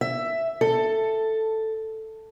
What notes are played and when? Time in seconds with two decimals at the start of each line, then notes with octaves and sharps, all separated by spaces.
0.01 E5
0.61 A4